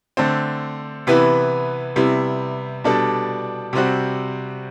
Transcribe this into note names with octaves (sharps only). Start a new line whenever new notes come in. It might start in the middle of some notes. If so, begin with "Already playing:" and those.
D3 A3 C4
C3 E3 B3 E4 B4
C3 G3 B3 E4
B2 G3 D4 A4
C3 G3 C4 F#4